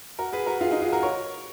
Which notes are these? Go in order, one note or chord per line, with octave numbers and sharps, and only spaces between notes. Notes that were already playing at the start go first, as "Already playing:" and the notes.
F#4 A#4
G#4 B4
F#4 A#4
F4 G#4
D#4 F#4
F4 G#4
F#4 A#4
A#4 C#5